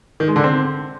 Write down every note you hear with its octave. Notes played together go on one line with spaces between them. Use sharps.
D#3
G#3
D3
C4